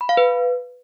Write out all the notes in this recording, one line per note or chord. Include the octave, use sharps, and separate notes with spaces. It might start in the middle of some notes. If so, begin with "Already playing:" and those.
B5
F5
B4